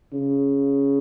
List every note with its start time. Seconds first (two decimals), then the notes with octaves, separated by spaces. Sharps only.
0.12 C#3